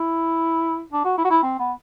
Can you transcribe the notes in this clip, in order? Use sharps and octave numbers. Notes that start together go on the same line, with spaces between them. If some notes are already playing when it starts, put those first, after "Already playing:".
Already playing: E4
D4
F#4
E4
F#4
E4
C4
B3